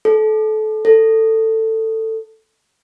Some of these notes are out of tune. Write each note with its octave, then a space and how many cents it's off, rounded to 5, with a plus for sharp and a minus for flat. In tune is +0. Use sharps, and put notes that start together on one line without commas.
A4 -25
A4 +15